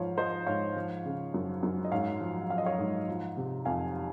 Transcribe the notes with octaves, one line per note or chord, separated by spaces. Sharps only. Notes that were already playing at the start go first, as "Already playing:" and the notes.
Already playing: G#2 F3 C#5 F5
F3 C5 D#5
G#2 C#5 F5
F3
C#3
F#2
F#2
D#5
G#2 C#5 F5
F3
F3 F5
D#5
C#5 F5
G#2
F3
C3
F2 F5 G#5